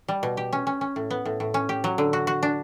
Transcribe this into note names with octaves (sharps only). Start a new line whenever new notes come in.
G3
B2
G4
C#4
C#4
C#4
A2
B3
A2
A2
C#4
G4
F#3
D3
F#4
F#4
D4